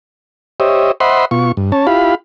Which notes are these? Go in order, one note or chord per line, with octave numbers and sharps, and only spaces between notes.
G4 C5 C#5 D#5 E5
C5 D#5 E5 F#5 B5 C6
B2 F4 C#6
G2
C#4 C#5 A5
E4 F4 G4 F5 B5